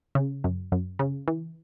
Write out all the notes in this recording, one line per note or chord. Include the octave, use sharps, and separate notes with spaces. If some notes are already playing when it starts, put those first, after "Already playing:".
C#3
F#2
F#2
C#3
E3